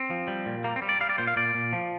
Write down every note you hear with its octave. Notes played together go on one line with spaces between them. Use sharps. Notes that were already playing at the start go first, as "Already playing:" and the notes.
Already playing: C4
F3
G3
A#2
G3 A#3
C4
G3
D5
G3 F5
D5
A#2 C5
F5
A#2 D5
A#2
F3